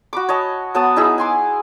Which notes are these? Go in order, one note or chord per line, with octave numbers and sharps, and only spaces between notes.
F#4 B5 D6
C#5 D#5 A5
F#3 B3 A5 D#6
D#4 E4 G#4
G#5 C6 D6